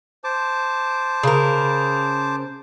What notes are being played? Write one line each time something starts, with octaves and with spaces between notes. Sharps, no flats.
C5 A5 D6
C#3 A#4